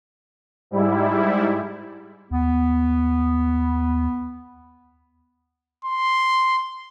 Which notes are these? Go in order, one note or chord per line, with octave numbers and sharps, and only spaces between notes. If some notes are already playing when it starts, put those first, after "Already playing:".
G#2 G3 E4
D#2 B3
C6